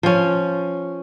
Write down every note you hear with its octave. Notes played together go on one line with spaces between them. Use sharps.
F3 C#4